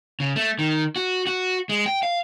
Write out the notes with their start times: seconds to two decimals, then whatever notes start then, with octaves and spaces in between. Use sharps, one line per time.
0.20 C#3
0.36 A3
0.59 D#3
0.96 F#4
1.27 F#4
1.69 G#3
1.86 G5
2.03 F5